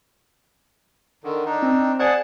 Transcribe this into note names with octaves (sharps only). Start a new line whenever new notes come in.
D3 D#3
D4 D#4
C4
G#4 C5 D5 F#5 G#5 A5